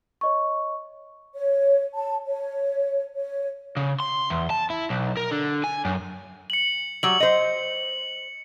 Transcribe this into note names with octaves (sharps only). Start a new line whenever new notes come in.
C#5 D#5 C#6
C#5
A5
C#5
C#5
C#3
C6
E2
A5
E4
B1
A#4
D3
G#5
F#2
C#7 F#7
F#3 G3 F#7
C5 D#5